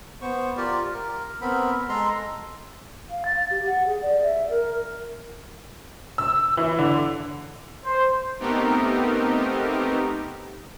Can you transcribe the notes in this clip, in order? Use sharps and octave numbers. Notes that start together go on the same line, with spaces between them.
B3 C5 C#6
F4 G4 A#4 D5
A#4
B3 C4 A#4 B5
G#3 A4 A#5 C6
F5
A6
G4
F#5
G#4
D5
E5
A#4
E6
E3
D3
C5
A3 B3 C4 D#4 G4 A#4